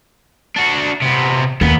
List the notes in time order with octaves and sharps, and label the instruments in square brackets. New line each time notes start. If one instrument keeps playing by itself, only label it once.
[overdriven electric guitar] D4 F#4
C3 B3
[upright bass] D#2 [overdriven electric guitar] A#2 B3